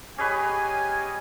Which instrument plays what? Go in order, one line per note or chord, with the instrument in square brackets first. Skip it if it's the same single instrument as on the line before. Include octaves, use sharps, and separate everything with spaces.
[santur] C#4 G#4 B4 [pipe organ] G4 C#5 D#5 [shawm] G#5